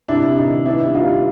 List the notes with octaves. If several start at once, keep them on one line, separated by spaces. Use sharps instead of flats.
C3 D4 E4
C3
D#4
D#3
B3 D4 E4
G3
D#4 F4
G3